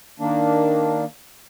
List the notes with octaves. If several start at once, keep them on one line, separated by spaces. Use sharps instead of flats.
D#3 A#3 D4